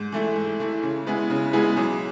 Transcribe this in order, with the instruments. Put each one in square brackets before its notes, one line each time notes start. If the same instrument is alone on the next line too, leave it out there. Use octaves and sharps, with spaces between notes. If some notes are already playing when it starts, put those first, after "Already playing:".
Already playing: [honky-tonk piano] G#2
E3 A3 E4
G#2
E3 A3 E4
C#3
G#3 B3 E4 G#4
C#3
G#3 B3 E4 G#4
B1